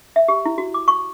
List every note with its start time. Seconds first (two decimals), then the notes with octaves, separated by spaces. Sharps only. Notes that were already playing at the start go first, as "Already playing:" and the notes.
0.16 E5
0.28 G4
0.46 E4
0.58 F#4
0.74 D6
0.88 C#6